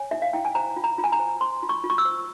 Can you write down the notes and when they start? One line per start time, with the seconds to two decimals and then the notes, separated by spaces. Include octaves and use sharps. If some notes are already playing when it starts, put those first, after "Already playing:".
Already playing: C#5 G#5
0.11 E4 E5
0.22 F5
0.33 E4 G5
0.45 G#5
0.55 C5 A#5
0.76 F4
0.84 A#5
0.98 F4
1.04 G#5
1.12 A#5
1.20 C5
1.41 C5 C6
1.63 F4
1.69 C#6
1.84 F4
1.90 C#6
1.98 E6
2.05 C5